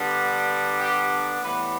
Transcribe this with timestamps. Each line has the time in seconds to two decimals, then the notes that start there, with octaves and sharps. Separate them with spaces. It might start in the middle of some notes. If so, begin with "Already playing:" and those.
Already playing: D3 G3 B3 D4
0.79 G4
1.41 A2 E3 G3 B3 B4